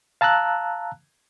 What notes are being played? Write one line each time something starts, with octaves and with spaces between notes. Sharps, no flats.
F5 A5 A#5 E6 F#6